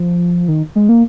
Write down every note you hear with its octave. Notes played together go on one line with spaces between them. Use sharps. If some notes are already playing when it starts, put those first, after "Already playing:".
Already playing: F3
D#3
G#3
A#3